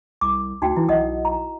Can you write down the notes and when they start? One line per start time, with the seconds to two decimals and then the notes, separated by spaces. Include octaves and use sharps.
0.21 C2 D6
0.62 D2 D#4 F#4 G5
0.76 E3 E4
0.89 B1 D#5 F#5 D#6
1.25 A#5